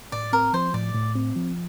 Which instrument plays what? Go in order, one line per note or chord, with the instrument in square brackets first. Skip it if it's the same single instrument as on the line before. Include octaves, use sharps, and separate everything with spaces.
[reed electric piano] A2 [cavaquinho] D5
[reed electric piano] C4 [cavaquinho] A#4
[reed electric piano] F3 [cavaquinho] C5
[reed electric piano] A2 [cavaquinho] D5
[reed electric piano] A2
C4
F3